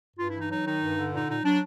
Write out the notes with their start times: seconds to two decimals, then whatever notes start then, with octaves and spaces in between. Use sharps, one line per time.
0.17 G2 F4
0.27 E4
0.33 E3
0.38 D#4
0.48 F#3 D#4
0.65 D#3 D#4
0.80 G2
0.97 D3
1.12 A#2 D#4
1.28 A#2 D#4
1.44 F#3 D4